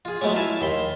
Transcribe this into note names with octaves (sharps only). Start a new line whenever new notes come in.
F4 G#4
F#3 G#3 A3 B3 C#4
E4 F5 G#5 A5
D#2 B5 C6